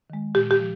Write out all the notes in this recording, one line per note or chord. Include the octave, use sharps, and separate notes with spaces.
D#3 G#3
A#2 G4
G4
F3